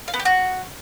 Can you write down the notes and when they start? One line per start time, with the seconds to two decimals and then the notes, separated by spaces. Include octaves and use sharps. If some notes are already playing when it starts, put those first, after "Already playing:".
0.08 F5
0.14 B3
0.20 G4
0.25 F#4